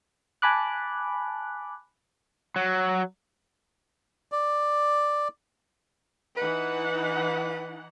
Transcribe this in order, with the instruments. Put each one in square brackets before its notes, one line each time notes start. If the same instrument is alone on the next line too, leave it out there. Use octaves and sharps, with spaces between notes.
[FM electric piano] G#5 A5 B5 D6 F#6
[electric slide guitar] F#3
[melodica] D5
[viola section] E3 D#4 F#5 [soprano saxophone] B4